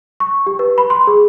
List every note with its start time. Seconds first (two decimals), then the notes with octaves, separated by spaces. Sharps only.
0.20 C#6
0.47 G4
0.59 B4
0.78 B5
0.90 C6
1.07 G#4